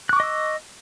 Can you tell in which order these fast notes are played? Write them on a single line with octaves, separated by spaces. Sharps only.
F#6 C#6 D6 D#5 E6